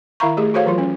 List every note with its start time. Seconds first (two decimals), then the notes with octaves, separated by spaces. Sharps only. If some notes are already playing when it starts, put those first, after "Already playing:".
0.20 D#3 E4 E5 F5 A#5 C#6
0.37 A3 G4 G#4
0.54 F#4 A4 C5 C#5 F5
0.66 E3 F#3 F4
0.78 C#4